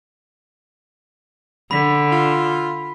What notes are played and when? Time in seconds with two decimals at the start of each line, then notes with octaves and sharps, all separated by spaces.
1.71 D3 B5 B6
2.12 F4